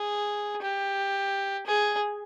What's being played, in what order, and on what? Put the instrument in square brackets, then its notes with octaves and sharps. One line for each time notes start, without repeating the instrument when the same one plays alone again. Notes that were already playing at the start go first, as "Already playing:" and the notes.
Already playing: [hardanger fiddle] G#4
G4
G#4